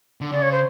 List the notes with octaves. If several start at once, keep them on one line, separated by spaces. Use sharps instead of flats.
D3
C#3 D5
C#5
C5